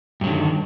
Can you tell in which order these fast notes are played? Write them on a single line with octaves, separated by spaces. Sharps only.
G2 F#3 D3 D#3